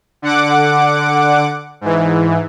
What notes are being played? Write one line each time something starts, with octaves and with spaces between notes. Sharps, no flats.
D3 F#5 D6
G#2 E3